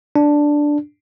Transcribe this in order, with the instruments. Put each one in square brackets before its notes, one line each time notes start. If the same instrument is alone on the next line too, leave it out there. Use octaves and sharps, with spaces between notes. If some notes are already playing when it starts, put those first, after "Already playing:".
[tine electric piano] D4